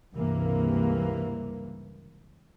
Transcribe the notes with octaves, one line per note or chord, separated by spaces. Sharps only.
C#2 G2 C3 E3 A#3